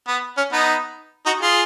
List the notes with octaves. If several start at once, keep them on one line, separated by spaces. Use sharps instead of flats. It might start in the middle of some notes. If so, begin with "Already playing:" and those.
B3
C#4
B3 D#4
D#4 F#4
F4 G#4